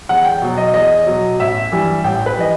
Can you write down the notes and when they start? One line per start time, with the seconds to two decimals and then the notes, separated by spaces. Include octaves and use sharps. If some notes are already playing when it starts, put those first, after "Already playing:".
0.09 E2 F#5
0.25 G5
0.42 B2 F#3
0.58 D#5
0.74 E2 D#5
1.07 B2 F#3
1.40 A1 E5
1.72 G2 E3 G3
2.04 A1 G5
2.26 B4
2.37 E3 G3 D#5